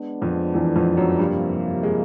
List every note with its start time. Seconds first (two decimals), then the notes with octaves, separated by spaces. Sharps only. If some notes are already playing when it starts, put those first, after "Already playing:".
Already playing: G#3 B3 D4
0.22 F2 F3
0.54 E2 E3
0.75 F2 F3
0.97 F#2 F#3
1.19 G2 C3 F3 G3 A#3
1.83 G#3